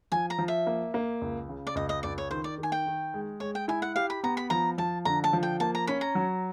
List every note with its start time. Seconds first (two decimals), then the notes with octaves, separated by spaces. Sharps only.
0.12 F3 G#5
0.30 A#5
0.38 F3
0.48 E5
0.67 A#3
0.94 A#3
1.21 C#2
1.49 C#3
1.67 D5
1.75 C#2 D#5
1.89 D#5
2.03 C#2 D5
2.18 C#5
2.31 D#3 C5
2.44 D5
2.58 D#3 G#5
2.72 G5
2.86 D#3
3.14 G#3
3.40 G#3 C#5
3.55 G5
3.68 E4 G#5
3.82 F#5
3.96 G4 F5
4.10 B5
4.23 B3 A#5
4.37 B5
4.50 F3 A#5
4.78 F3 A5
5.05 D3 A#5
5.24 A5
5.33 F3
5.43 G5
5.60 A#3 A5
5.75 A#5
5.87 C#4 B5
6.01 A#5
6.15 F#3